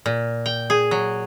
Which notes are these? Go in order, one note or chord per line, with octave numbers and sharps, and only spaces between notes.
A#2
G5
G#4
F#3